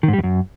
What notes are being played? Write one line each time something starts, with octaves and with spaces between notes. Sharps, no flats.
D#3
G#2
G3
E2
F#2